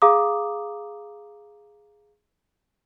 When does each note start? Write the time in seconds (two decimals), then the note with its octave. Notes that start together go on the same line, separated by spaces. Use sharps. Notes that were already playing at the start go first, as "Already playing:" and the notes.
0.02 G#4 F5 A#5 D6 D#6